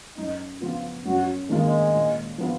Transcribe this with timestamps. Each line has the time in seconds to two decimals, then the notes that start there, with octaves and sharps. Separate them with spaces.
0.17 F#2 D#4
0.61 C#3 F3 B3 F4
1.05 F#2 F#4
1.49 D#3 G#3 A#3 F4
1.94 A#2
2.38 F3 B3 F4